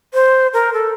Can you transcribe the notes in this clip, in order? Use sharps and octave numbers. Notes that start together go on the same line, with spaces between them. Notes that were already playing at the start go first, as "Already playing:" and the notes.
C5
A#4
A4